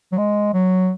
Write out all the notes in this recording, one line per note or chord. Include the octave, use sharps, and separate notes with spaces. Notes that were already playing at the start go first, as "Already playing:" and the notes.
F#3
G#3
F#3